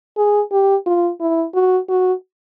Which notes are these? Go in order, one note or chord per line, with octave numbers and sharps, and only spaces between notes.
G#4
G4
F4
E4
F#4
F#4